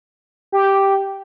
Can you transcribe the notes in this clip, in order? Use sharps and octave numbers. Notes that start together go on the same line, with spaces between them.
G4